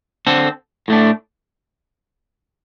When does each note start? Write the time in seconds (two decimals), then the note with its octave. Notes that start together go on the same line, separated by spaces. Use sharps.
0.27 D3 C4 A4
0.88 A2 A3 D4